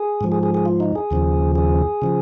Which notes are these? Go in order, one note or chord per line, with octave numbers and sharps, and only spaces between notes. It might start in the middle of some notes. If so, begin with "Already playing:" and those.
Already playing: G#4
G#2 F3
G#4
G#4
G#4
F4
D#4
G#4
D#2 C#3 F3
G#4
C#3 F3